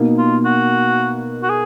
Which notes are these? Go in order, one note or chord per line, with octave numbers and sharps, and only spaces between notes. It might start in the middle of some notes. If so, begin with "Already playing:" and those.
Already playing: B2 A#3 D#4
F4
F#4
F#4
G#4